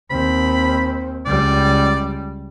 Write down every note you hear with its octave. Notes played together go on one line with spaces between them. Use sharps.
D#2 C4 B5
C#2 G3 D5